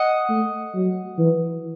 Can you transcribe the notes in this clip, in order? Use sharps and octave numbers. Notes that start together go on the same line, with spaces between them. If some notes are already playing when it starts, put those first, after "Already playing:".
Already playing: D#5 F#5
A3
F#3
E3